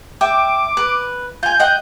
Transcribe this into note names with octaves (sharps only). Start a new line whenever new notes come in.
E5 G5 D6
B4
F4 G#5 G6
D#5 F#5 G5